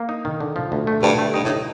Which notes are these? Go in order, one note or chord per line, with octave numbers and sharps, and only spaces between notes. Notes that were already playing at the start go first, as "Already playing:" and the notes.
Already playing: A#3
D#4
D#3
D3
F3
D2
A3
D2 G2
A3
G2 D#4
A2
D#4